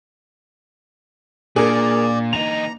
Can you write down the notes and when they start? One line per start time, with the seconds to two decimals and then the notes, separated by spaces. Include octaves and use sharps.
1.56 A#2 A#3 D4 G#4 A#4 D5
2.33 E3 D#4 A#5 F7